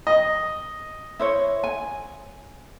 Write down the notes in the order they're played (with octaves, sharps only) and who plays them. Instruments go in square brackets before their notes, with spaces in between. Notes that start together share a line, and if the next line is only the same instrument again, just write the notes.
[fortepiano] D#5
[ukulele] E4 C5 C#5
G#5